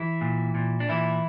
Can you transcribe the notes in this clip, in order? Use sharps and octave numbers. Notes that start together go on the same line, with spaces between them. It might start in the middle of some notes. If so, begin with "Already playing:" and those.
Already playing: E3 E4
A#2
A#2
D4
A#2 E3 E4